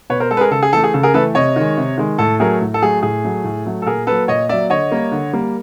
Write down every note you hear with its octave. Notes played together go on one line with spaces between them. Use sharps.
B2 B4 C#5
A#4 C5
G#3 A4
B4
G#4 A#4
C#3 A4
G#4
E3 A3 A4
G#4
C#3 A4
G#4 A#4
E3 A3 A4 B4
C3 C#5 D#5
D#3 G#3
C3
D#3 G#3
A2 A4
F#3 A3 G#4 A#4
A2
A4
F#3 A3 G#4
A2 G#4
F#3 A3
A2
F#3 A3
A4
A#2 G#4 A#4
F#3 A#3 A4 B4
A#2 C#5 D#5
F#3 A#3 D5 E5
D3 C#5 D#5
G3 A#3
D3
G3 A#3